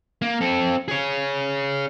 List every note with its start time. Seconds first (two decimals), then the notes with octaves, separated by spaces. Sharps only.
0.22 A#3
0.41 C4 A4
0.88 G#4 C#5